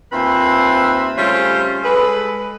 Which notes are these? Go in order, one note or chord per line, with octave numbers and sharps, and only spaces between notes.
D#2 C4 F4 B4 C5 E5
C#3 G3 A3 F4 C5 C#5
G#3 G#4 A4 B4